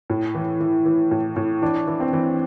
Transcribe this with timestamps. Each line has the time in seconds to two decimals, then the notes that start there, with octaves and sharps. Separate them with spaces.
0.10 A2
0.35 E3
0.60 E3
0.86 E3
1.11 A2
1.36 A2
1.62 E3 D4
1.87 E3
2.00 C4
2.13 E3